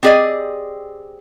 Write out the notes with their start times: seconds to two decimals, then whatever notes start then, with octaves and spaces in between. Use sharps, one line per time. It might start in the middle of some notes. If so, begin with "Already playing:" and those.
0.03 C4 G4 G#4 D5 D#5